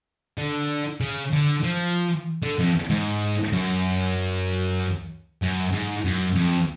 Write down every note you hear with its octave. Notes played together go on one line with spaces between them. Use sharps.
D3
C#3
D3
F3
D3
F2
G#2
F#2
F#2
G#2
F#2
F2